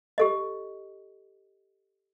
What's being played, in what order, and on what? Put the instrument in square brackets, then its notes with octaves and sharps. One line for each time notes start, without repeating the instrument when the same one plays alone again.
[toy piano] G4 A4 D#5